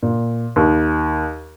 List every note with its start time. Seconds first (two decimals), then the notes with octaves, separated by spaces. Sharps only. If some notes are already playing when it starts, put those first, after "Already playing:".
0.03 A#2
0.56 D#2